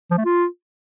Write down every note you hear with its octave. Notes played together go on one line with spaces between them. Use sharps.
F3
A3
F4